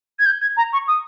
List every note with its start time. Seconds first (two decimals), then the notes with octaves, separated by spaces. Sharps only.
0.19 G#6
0.26 G6
0.41 G#6
0.57 A#5
0.73 C#6
0.88 D#6